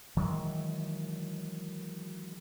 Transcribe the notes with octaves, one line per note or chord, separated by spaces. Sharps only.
D#3 E3 F#3 G#3